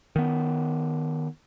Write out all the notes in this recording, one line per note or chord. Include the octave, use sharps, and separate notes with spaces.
D#3 B3